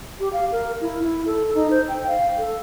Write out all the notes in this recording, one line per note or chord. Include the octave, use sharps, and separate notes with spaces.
G4
F5
A#4
E4
E4
A4
D#4
C5
G5
F5
A4